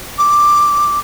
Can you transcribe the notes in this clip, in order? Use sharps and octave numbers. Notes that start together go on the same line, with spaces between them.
D6